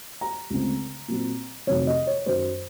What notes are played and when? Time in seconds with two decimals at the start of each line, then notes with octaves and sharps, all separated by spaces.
0.21 A#5
0.50 C#2 C#3 A3 C4
1.08 A#2 F#3 C4
1.67 F2 C3 D#3 F#3 A3 C#5
1.87 D#5
2.07 C#5
2.26 F#2 D#3 F#3 C5